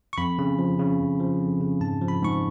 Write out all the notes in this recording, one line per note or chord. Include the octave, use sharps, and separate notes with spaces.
C#6
F2 B5
C#3
F3
C#3
F2
F3
F2
C#3
G#2 A5
F3
B5
G#2 C#6